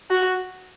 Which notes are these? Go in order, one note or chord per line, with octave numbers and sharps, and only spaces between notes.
F#4